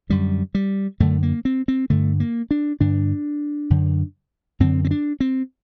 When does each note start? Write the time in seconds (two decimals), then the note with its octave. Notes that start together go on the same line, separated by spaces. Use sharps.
0.09 F#2 D3 G3
0.55 G3
1.00 F#2 D3 A3
1.23 A#3
1.45 C4
1.68 C4
1.90 G2 D3 A3
2.20 A#3
2.51 D4
2.80 G2 D3 D4
3.70 F#2 D3
4.60 F#2 D3 C4
4.85 C4
4.91 D4
5.20 C4